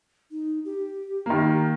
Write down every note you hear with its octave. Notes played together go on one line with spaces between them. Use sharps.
D#4
G4
D#3 A#3